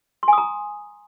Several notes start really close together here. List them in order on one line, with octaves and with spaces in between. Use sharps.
C6 G#5 D#6 A#5